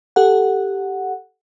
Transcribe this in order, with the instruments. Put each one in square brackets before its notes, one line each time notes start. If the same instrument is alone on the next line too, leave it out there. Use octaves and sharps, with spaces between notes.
[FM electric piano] G4 A4 F#5